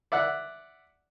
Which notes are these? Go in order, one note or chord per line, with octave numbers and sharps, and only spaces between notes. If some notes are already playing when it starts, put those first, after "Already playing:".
D5 E5 F#5